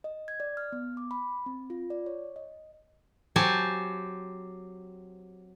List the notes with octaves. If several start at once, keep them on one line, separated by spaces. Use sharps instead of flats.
D#5
G#6
D5
F6
B3
D6
B5
C4
F4
D5
C#5
D#5
F#3 C4 G4 C5 G#5 A5